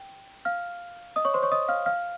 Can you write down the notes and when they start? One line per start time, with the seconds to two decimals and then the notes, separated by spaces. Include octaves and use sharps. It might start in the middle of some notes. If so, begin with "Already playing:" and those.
Already playing: G5
0.45 F5 F6
1.16 D#5 D#6
1.25 C#5 C#6
1.34 C5 C6
1.43 C#5 C#6
1.52 D#5 D#6
1.68 F5 F6
1.86 F5 F6